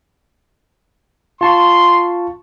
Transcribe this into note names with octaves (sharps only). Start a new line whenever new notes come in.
F4 A5 C6 C#6